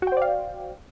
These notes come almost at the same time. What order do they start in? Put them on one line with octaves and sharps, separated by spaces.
F#4 G5 C5 D5 F5